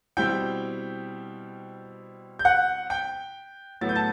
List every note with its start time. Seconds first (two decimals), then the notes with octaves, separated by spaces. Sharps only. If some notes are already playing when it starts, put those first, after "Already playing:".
0.17 B2 G3 C4 E4 G5 G6
2.39 G6
2.45 F#5 F#6
2.90 G5 G6
3.81 A2 F#3 B3 E4 A6
3.89 G6
3.96 A5 A6